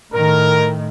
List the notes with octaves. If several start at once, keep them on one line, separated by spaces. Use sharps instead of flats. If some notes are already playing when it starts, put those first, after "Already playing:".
A2 D#3 A#4